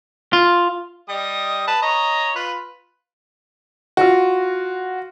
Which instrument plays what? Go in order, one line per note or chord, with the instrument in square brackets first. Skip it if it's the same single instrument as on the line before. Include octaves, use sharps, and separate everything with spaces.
[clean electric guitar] F4
[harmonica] G3 D#5 D#6
B4 A5
C#5 D#5 A#5
F4 B4
[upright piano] F4 F#4